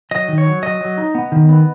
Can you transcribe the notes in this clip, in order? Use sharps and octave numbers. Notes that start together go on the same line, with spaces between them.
F#3 D#5
D#3
C#5
F#3
F#3 D#5
F#3
D#4
B3
D#3
B3